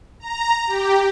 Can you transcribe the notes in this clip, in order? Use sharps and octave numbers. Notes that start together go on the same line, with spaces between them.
A#5
G4